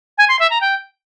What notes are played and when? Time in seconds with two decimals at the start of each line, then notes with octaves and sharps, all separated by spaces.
0.18 G#5
0.29 C6
0.39 E5
0.50 A#5
0.61 G5